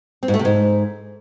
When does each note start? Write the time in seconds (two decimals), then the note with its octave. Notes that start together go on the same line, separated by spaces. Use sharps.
0.23 C4
0.28 G#2
0.34 A3
0.39 C3
0.45 G#2